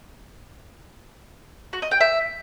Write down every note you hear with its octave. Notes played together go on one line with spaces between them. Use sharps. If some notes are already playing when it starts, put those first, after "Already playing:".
F#4
D#5
G5
E5